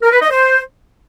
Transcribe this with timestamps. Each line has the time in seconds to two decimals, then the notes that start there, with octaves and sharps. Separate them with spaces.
0.02 A#4
0.12 B4
0.21 D#5
0.31 C5